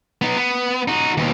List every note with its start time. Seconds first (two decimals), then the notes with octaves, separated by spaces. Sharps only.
0.22 B3 D#4
0.37 B3
0.88 D#4 F#4
1.18 D#2 B2